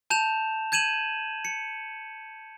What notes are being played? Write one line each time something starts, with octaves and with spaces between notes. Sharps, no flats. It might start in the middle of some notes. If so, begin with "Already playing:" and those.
A5 G6 E7 F7
G6 G#6 D#7 E7 F#7
C#7